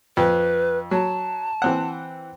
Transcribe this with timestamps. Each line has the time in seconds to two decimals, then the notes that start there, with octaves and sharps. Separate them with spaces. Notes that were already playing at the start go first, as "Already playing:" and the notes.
0.17 F2 B4
0.91 F#3 A5
1.62 E3 C4 F#5